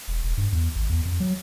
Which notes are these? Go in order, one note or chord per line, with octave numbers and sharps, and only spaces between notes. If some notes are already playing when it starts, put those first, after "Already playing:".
E1
E1
G2
E2
G#1
E2
F2
F#3